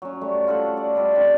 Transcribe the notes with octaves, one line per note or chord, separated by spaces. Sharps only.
F#3 C#4
G3 A3
F4 A4 F#5
D5
B2 G3 E5
E3 C4 D4